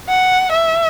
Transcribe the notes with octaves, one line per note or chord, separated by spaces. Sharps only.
F#5
E5